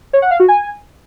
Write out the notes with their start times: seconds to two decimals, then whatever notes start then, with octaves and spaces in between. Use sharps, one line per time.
0.13 C#5
0.22 F#5
0.31 F5
0.40 F#4
0.48 G#5